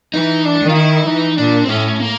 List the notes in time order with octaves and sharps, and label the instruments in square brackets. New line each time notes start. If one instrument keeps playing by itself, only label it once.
[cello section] E3 [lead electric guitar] D#4
[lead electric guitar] D4
[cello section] D#3
[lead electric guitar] F4
E4
[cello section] E3 [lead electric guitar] D#4
[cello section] A#2 [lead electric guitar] D4
[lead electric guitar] C4
[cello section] A2 [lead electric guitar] C#4
[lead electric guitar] A#3